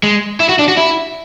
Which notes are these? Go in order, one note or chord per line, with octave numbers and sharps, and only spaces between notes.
G#3
E4
F#4
D4
F#4
E4